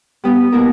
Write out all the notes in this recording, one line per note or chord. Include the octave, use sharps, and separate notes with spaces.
G3 B3 G4
B2 A#3 E4 A#4